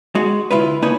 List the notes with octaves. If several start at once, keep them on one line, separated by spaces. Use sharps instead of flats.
G#3 F#4
D2 E4 F4 B4
C#3 A#3 D#4 B4 C#5 G#5